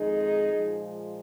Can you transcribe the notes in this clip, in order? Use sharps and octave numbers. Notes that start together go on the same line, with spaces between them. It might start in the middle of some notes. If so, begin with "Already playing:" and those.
Already playing: F2 D#3 G#3 D#4 G#4
A#2 F3 G#3